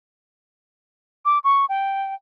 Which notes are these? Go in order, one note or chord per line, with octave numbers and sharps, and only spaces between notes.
D6
C#6
G5